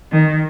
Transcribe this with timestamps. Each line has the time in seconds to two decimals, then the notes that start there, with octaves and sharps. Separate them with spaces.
0.12 D#3